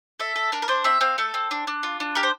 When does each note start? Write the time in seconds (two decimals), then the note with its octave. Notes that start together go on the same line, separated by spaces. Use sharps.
0.20 A4 E5
0.36 A4
0.52 D4 A#4
0.62 A#4
0.68 D4 C5
0.84 C4 E5
1.01 C4 F5
1.18 A3 A4
1.34 C4
1.51 D4
1.67 D4
1.83 F4
2.00 D4
2.15 G4 A#4
2.23 C5